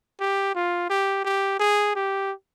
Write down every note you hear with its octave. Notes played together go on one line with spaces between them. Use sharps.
G4
F4
G4
G4
G#4
G4